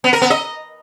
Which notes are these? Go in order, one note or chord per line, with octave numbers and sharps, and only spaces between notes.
B3
A#4
B3
D#5